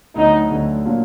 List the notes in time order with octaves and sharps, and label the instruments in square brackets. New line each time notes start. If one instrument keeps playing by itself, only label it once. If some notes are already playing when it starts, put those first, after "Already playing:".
[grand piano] D2 D3 F#3 B3 [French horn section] D#4
[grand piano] D2 D3 F#3 B3
A#2 F#3 A#3 D4 F4